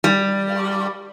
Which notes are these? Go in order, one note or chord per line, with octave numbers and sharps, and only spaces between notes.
G3